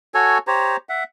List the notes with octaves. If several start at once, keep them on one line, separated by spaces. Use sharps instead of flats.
F#4 A4 C#5 G#5
G4 C5 C#5 A#5
E5 F#5